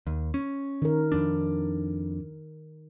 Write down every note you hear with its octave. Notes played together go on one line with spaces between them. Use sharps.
D#2
C#4
D#3 A#4
F2 D4